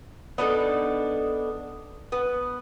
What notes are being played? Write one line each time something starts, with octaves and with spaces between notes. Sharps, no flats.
B3 D4 D#4 A4
B3